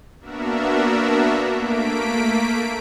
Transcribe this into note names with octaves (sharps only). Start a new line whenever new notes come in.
A#3 B3 D4 F#4 A#4 E5
A3 A#3 B6 D7